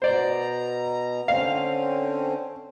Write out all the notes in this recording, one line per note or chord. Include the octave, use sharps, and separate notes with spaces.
B2 C5 D5 A#5
D3 C4 C#4 F5